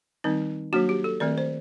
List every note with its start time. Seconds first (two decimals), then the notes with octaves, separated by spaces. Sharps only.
0.24 D#3 G3 C4 D#4
0.73 F#3 A#3 D4 F#4
0.89 G4
1.04 A4
1.20 D#3 A3 C4 D5
1.38 C5